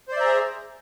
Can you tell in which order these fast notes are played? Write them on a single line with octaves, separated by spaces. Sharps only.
C5 D5 E5 A#5 G#4